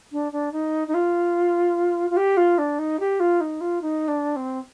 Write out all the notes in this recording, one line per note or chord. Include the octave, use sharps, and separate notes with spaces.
D4
D4
D#4
D#4
F4
F4
G4
F4
D4
D#4
G4
F4
D#4
F4
D#4
D4
C4